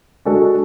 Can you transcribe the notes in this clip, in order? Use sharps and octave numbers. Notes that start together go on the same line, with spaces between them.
G#3 D4 F#4 A4